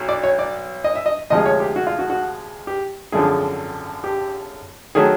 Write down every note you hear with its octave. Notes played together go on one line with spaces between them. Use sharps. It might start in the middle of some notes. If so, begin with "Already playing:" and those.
Already playing: B1 F#3
D5
C#5
D5
D#5
E5
D#5
D2 C3 F3 G#3 D#5
C#5
G4
F#4
F4
F#4
F#4
G4
G#1 F#2 D3 F3 G#4
G4
D#3 F#3 A3 G#4